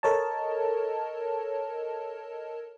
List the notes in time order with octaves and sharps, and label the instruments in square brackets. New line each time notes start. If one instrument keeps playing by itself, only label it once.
[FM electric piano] A4 A#4 C#5 D#5 A5